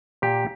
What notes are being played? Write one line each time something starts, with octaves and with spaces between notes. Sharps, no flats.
A#2 G4